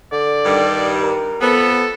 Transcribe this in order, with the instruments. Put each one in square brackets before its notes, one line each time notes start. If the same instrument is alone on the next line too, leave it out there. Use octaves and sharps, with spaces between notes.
[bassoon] D3 [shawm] D5
[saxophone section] G2 D#3 G3
[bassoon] A#4
[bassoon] F2 [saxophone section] B3 [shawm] A4